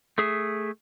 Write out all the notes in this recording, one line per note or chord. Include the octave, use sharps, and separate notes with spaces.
A3 G#4 E5